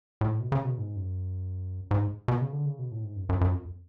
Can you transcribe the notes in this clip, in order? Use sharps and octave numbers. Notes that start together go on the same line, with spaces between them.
A2
B2
C#3
B2
G#2
F#2
G#2
B2
C#3
D3
C#3
B2
A2
G#2
F#2
F#2
F#2
F2